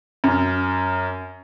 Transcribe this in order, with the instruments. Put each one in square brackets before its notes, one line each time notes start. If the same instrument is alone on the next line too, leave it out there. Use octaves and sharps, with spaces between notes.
[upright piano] F#2